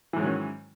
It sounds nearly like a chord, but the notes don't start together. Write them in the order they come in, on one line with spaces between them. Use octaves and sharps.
E3 G#2 F#3 D#3 C#4